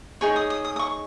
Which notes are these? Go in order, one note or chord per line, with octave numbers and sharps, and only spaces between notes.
D#4 G#4 C#5 C#6
D#6
D#6
D#6
D#6
C#6